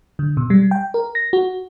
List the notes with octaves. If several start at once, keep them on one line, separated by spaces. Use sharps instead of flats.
D3
B2
G3
G5
A#4
A#6
F#4